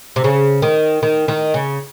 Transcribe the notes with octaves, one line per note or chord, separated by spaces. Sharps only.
C3
C#3
D#3
D#3
D#3
C#3